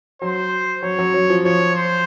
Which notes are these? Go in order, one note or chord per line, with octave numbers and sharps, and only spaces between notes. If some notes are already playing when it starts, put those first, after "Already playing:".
F#3 C5
F#3 C#5
F#3
F#3
F3
F3 C#5
C5